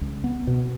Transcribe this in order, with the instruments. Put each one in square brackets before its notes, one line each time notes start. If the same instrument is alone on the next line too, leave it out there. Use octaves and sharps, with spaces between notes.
[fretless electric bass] C#2
B3
B2